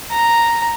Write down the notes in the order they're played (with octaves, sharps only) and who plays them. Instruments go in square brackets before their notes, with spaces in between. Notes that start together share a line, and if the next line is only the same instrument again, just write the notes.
[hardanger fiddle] A#5